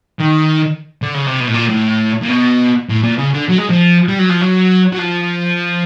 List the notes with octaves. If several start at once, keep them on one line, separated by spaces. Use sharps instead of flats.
D#3
D3
C#3
C3
B2
A2
A#2
A2
A#2
B2
A2
A#2
C#3
D3
F#3
G#3
F3
G3
F#3
F3
F#3
F#3
F3